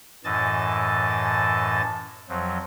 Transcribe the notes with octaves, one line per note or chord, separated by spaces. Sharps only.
F#2 A2 E3 D#5 A5 A6
F2 F3 F#3